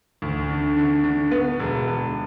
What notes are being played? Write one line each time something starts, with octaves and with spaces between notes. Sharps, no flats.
D2
D3
D3
D3
B3
E1
E1